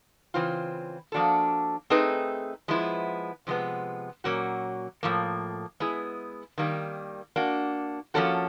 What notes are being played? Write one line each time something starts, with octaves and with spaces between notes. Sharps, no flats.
C#3 E3 C4 F4
F3 A#3 D4 F#4 A4
A3 C4 D#4 G#4 B4
F3 G#3 B3 E4
C3 F3 G#3 B3
A#2 F#3 A#3 C#4 F#4
A2 F3 A#3
G#3 B3 E4 G#4
D#3 G3 A#3
A#3 D4 F#4
F3 A#3 C#4 F#4 A4